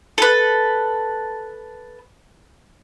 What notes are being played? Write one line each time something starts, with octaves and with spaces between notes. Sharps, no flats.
A4 B4